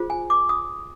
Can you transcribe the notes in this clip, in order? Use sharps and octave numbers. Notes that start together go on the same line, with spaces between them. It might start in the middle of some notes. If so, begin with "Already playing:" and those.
Already playing: F4 G#4 C5
G#5
D6
D#6